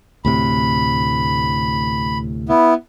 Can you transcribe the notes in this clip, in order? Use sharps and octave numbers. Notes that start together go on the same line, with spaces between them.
D2 A2 C3 B5
B3 E4